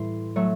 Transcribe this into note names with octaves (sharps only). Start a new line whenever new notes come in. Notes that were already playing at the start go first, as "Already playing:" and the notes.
Already playing: A2 E3 G3 C6
F#3 A3